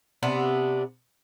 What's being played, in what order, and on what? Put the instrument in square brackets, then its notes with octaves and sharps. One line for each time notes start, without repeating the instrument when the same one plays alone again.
[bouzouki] C3 B3 D4